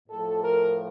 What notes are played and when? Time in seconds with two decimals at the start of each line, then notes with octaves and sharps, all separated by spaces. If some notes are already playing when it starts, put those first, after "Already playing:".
0.09 A2 F3 A4
0.43 A#4